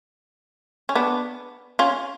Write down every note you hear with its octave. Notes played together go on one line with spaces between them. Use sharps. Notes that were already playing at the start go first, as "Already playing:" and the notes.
C#4
B3 D4
C#4 F4